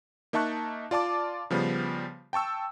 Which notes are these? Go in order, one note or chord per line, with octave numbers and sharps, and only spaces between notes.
A#3 D#4 E5 A5 C#6 F#6
F4 D5 A5 D6
C#3 F3 G3 B3
G5 A5 C#6 E6